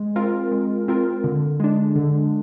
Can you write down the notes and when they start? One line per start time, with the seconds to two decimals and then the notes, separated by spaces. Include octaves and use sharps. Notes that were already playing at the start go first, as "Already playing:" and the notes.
Already playing: G#3
0.16 C4 F4 A#4
0.51 G#3
0.88 C4 F4 A#4
1.24 D3
1.60 G#3 D4
1.96 D3